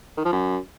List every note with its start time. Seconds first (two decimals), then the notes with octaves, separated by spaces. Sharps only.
0.17 D#3
0.25 F3
0.32 F#2